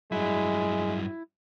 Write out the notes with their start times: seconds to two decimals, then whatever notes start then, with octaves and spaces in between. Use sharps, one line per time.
0.12 G2 F#3 G#3 E4